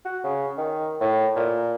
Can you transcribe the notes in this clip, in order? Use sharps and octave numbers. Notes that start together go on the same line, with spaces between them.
F#4
C#3
D#3
A2
A#2